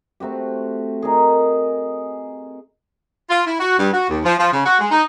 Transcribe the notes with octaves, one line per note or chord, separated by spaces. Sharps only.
A3 C4 F#4 G4
G#4 A#4 D#5
F4
E4
F#4
G2
F#4
D#2
F3
F3
C#3
F#4
G#3
D#4